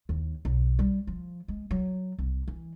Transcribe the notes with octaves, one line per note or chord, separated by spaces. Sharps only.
D#2
B1
G3
F3
G#3
F#3
C2
E3